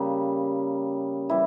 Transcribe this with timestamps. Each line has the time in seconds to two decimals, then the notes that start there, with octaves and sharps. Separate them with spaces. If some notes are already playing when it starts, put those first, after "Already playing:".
Already playing: C#3 G3 A#3
1.30 E3 G3 E4